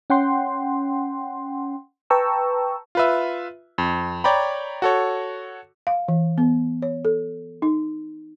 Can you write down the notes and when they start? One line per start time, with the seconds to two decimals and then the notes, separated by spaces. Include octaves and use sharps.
0.10 C#4 F#5 G5 C6
2.10 B4 G5 A5 A#5 C#6 E6
2.95 F4 B4 E5
3.78 F2
4.24 C#5 D5 G5 A#5 B5
4.82 F#4 A4 C#5
5.87 F5
6.08 E3
6.38 B3
6.82 C#5
7.05 A4
7.62 D#4